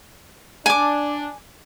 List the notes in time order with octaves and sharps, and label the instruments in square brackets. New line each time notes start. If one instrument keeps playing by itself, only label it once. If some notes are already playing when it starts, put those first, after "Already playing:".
[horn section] D4 [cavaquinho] G#5 D6